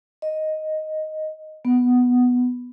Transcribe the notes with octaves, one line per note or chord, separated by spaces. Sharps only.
D#5
B3